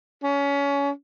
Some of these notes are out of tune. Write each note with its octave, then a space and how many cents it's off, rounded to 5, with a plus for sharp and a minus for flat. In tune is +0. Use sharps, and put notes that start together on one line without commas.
C#4 +25